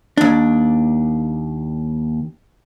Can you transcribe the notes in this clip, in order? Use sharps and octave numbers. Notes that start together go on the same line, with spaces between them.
D#2 D4